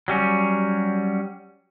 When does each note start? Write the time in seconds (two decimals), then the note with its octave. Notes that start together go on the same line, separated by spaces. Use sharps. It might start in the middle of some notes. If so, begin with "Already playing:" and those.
0.08 F#3 G3 C#4